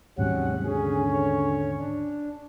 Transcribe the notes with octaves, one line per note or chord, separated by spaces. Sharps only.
D#2 G#2 C3 F#3 G3 C#4 F#5
D3 C#4 G#4
C#5
D4